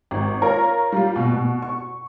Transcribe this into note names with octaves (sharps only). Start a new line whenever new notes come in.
G#1
F4 A#4 C#5
G3 F4
B2
B2
C#6